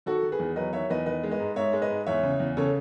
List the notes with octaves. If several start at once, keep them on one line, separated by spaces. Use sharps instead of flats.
D#3 F#4 A4
D#3
G#4 B4
E2
F#3 B4 D#5
D#3 C#5 E5
E2 B4 D#5
D#3 B4 D#5
G#3
B4 D#5
G#2
G#2 C#5 E5
G#3
B4 D#5
G#2
E2 C#5 E5
C#3
E2
C#3 A4 C#5